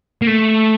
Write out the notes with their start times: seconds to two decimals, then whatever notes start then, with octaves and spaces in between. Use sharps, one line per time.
0.22 A#3
0.27 A3